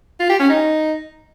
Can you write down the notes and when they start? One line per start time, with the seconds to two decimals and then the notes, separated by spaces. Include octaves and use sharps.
0.19 F4
0.29 G4
0.39 C#4
0.49 D#4